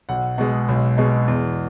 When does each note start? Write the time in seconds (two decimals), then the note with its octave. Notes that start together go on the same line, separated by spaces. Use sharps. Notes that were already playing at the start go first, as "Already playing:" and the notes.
0.09 B1 F#5
0.38 B2 G#3
0.68 B1
0.98 B2 G#3
1.28 E2